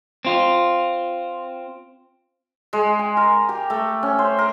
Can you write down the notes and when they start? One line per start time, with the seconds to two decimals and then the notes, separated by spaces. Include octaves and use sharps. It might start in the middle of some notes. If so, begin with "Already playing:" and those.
0.25 C4 F4
2.73 G#3
2.99 G#5
3.17 A#4
3.49 G4
3.70 A3
4.03 C#4
4.19 C5
4.38 A#4